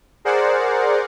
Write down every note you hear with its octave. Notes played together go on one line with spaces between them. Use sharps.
G#4 A#4 C5 D5 F#5